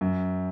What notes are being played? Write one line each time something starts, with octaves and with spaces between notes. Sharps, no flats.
F#2